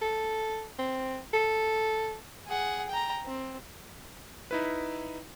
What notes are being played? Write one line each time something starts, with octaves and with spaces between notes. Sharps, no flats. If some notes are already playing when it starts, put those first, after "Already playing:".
A4
C4
A4
G#4 F#5
G5 A#5
C4
D#4 E4 B4